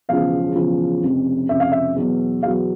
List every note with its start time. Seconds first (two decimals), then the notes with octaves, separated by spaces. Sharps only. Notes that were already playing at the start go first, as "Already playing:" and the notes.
0.09 E1 E2 C#3 F3 F5
0.55 E1 E2 C#3 F3
1.03 F1 F2 C#3
1.49 F1 F2 C#3 E5
1.60 F5
1.72 E5
1.96 E2 B2 F#3
2.43 E2 B2 F#3 F5